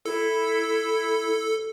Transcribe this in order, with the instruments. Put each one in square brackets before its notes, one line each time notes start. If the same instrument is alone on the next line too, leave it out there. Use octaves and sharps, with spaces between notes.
[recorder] E4 [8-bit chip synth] A4